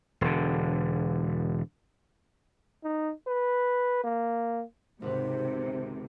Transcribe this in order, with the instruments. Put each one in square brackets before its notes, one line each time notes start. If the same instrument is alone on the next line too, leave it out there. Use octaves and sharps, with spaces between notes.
[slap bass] E1 D3
[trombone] D#4
B4
A#3
[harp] G#1 C#2 B4 [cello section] C3 [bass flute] C5